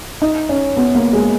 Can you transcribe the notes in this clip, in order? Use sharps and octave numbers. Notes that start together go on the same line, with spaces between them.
D#4
C#4
B3
A#3
G#3